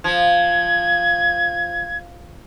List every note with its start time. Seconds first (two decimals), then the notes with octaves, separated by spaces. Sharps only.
0.04 F3 G#6